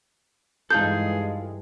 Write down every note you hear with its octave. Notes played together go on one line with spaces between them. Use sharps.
G2 E3 G#3 D#4 F4 G#4 A4 G6